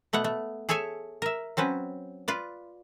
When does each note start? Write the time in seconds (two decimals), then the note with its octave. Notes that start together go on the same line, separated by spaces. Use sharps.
0.13 B2 A3 B3 F#5
0.24 A3
0.69 G#4 A4 C#5 E5 G#5
1.22 A#4 E5
1.57 F#3 C4 C#4 B4
2.28 F4 B4 D5